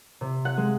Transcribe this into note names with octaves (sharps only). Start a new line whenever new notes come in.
C3
F#5
G#3